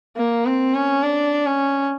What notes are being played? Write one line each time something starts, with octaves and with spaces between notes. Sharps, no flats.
A#3
C4
C#4
D4
C#4